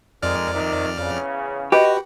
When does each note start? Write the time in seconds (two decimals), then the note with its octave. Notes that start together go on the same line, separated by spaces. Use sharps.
0.23 F2 D#3 G#3 A#4 D5 F6
0.53 C3 D#3
0.97 E2 C#3
1.72 F#4 G4 B4 D#5